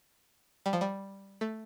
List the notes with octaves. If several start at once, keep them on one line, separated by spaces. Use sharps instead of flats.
G3
F3
G3
A3